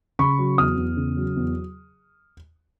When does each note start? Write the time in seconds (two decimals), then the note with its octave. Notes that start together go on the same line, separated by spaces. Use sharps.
0.19 C#3 B5 C#6
0.39 F#3
0.58 E2 D#6 F6
0.77 E2
0.97 C#3
1.17 F#3
1.36 E2